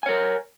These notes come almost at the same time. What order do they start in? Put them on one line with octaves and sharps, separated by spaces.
G#5 C#5 A#4